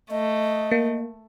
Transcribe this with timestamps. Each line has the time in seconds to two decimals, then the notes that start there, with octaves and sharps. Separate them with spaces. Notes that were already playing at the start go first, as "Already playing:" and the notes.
0.11 A3 D#5
0.71 A#3